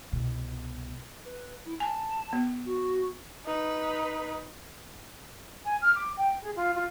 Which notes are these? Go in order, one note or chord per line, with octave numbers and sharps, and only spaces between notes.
C2 B2
B4
E4
G#5 A5
B3
F#4
D#4 B4
G#5
F6
D6
G5
G#4
F4
F4